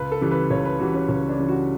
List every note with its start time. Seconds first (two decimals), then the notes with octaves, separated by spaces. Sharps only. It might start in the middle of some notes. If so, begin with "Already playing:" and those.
Already playing: C#2 B4
0.12 A4
0.21 C#3 E3 G3
0.31 B4
0.50 C#2 C#5
0.65 B4
0.80 C#3 E3 G3 F#4
0.94 C#4
1.09 C#2 C#4
1.29 D4
1.38 C#3 E3 G3
1.48 F#4